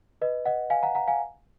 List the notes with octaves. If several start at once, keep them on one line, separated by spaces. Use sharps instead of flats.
B4 D#5
D#5 F#5
F5 G#5
F#5 A#5
F#5 A#5
F5 G#5